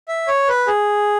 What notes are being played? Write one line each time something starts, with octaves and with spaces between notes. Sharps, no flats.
E5
C#5
B4
G#4